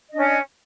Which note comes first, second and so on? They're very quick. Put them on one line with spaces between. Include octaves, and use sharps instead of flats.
D#5 D4 C#4